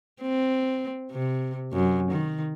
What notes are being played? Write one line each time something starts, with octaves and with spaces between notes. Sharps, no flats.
C4
C3
F#2
D#3